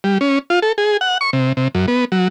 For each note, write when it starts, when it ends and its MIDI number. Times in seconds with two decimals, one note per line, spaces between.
0.04 0.18 55
0.21 0.39 61
0.50 0.59 65
0.62 0.72 69
0.78 0.97 68
1.01 1.18 78
1.21 1.30 85
1.33 1.53 48
1.57 1.68 48
1.75 1.86 42
1.88 2.05 59
2.12 2.28 54